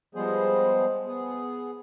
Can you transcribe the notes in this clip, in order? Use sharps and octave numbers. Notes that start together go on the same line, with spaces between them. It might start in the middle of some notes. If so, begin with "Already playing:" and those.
F3 G3 G#3 B3 G#4 C5
B3 G#4